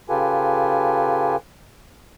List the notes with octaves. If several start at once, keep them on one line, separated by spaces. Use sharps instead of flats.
C#3 F4 G4 A4 B4 G#5